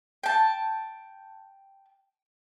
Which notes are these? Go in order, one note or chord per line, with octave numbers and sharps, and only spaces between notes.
G5 A5